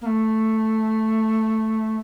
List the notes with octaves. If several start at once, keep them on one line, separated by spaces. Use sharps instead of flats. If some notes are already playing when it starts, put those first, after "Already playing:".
A#3
A3